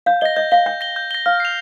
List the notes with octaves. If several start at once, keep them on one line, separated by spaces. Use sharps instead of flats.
F5 G6
D#5 A#6 G7
D#5 G6
F5 A#6 G7
G5 G6
A#6 G7
G6
A#6 G7
F5 F6
C7 F7